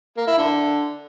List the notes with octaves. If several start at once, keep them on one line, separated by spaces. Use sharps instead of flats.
A#3
E4
D3